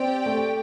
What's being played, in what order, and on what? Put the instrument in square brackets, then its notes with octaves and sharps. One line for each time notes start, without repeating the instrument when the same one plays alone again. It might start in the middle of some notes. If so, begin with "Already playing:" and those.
Already playing: [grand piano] C4 [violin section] G4 D5 G5
[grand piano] A3